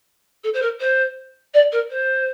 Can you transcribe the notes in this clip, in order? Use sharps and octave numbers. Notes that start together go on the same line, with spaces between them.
A4
C5
A#4
C5
D5
A#4
C5